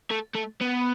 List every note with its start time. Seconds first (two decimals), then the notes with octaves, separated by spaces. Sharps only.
0.11 A3
0.35 A3
0.61 B3